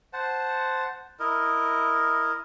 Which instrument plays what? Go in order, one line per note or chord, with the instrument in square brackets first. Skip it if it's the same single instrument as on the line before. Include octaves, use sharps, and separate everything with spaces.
[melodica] C5 F#5 A5
E4 A#4 D#5